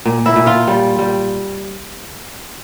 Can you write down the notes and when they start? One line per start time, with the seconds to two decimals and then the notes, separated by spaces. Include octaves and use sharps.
0.06 A#2
0.26 E4 E5
0.36 A#2
0.46 F4 F5
0.67 G3
0.99 G3